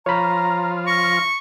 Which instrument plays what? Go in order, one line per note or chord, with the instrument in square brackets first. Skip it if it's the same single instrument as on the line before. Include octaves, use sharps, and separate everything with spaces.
[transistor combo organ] F3 F4 C5 [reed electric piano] C#5 B5 [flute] A#5
[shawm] C#6 [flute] A#6